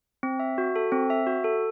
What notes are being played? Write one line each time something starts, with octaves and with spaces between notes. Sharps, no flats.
C4
E5
F#4
A4
C4
E5
F#4
A4